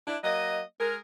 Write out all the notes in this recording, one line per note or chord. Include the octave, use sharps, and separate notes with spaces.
D4 E4
F#3 A#3 D#5
G#3 G#4 A#4